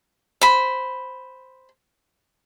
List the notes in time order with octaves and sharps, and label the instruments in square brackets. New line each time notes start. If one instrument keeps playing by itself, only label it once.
[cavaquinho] C5 B5